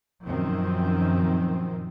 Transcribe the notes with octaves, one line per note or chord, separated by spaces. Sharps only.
F#2 A#2 D#3 F3 C4